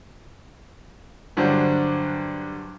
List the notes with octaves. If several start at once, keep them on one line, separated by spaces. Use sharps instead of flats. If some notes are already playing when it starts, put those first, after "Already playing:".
G2 D3 F#3 D4 C5